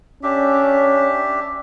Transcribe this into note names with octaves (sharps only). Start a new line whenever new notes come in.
C#4 D4 G4 E5